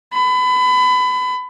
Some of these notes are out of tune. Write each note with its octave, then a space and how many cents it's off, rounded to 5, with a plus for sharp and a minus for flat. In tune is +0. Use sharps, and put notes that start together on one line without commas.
B5 +30